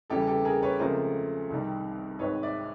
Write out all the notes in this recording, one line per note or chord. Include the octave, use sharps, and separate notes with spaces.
E2 C#3 E3 G3 G4 A4
G4 A4
G#4 A#4
B4 C#5
C#2 C#3 F3 A3 C4 A#4 C5
C2 C3 D#3 G3
G#1 G#2 D#3 B4 C#5
D5 E5